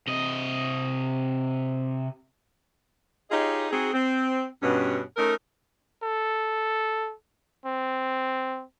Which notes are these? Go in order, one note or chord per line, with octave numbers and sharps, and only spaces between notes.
C3 D#5
D#4 F4 G4 G#4 C#5 D#5
C4 D#4 F#4 G#4
C4
G2 B2 C#4
A3 C#4 D#4 A#4
A4
C4